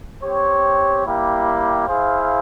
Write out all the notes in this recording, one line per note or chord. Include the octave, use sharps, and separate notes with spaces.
C4 G4 C#5
G3 A#3 E4 G4
E4 G#4 C5 F5